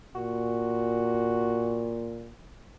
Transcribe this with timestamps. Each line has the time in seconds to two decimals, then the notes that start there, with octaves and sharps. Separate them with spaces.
0.15 A#2 F#4